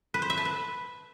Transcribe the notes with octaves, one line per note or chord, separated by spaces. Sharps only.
B4
C5
E5
A5
B4